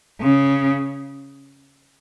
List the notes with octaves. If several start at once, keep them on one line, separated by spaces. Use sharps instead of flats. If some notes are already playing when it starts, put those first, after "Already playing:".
C#3